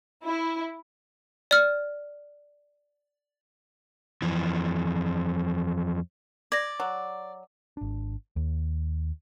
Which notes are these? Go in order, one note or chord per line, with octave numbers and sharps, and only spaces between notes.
E4
D5 F6
F2 E3
D5 G#6 A#6
F#3
G#1 D4
D#2